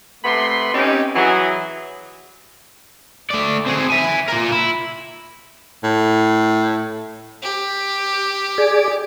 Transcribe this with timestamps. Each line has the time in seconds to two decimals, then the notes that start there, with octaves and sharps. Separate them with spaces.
0.24 C3 A3 B3 B5 C6
0.73 C4 C#4 D#4 G4
1.15 E3 F#3 G#4
3.30 A3 D5
3.66 C4 G#4
3.90 E5 G#5
4.29 F4 A#4
4.52 E4
5.83 A2
7.43 G4
8.58 G#4 D5